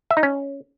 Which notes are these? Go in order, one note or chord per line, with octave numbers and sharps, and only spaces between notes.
E5
D#4
C#4